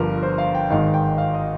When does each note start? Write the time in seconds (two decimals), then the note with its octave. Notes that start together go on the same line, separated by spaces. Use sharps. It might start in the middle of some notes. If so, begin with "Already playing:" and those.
Already playing: G1 G2 D3 F3 A#4
0.23 C5
0.38 F5
0.55 G5
0.70 G#1 G#2 D#3 F5
0.94 G5
1.18 F5
1.34 D#5